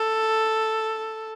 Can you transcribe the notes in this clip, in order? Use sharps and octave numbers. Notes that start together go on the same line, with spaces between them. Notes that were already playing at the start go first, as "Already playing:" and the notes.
Already playing: A4